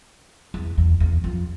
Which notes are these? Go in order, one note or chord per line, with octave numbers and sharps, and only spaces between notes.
E2
E2
E2
F2